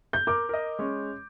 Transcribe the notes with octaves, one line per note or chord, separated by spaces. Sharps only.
G6
A#4 D6
A#4 D#5
G#3 C#4